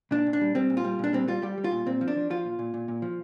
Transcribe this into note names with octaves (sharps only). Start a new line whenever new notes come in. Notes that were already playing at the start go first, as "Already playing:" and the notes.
A#2 D4
A#2
D4
G3
G3 C4
A#2
F4
G3
A#2 D4
G3 C4
G3 F4
G3 G4
G3
F4
A#2
A#2 C4
F3
D4
F3
F3 F4
A#2
A#2
A#2
A#2
F3